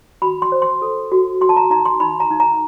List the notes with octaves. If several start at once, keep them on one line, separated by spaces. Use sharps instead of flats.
F#4 B5
C6
C5
C6
A4
F#4
F#4 C6
A5
A#5
D#4 A#5
C6
D#4 B5
A#5
D#4
A#5